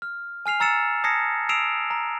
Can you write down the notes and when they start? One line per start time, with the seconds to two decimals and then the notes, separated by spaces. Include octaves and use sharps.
0.02 F6
0.46 G#5 F6 C7 F7
0.60 A#5 E6 A6 C#7 E7
1.04 A5 D#6 G#6 A#6 C7 C#7
1.49 D#6 E6 C7 D7 E7 F7
1.91 A#5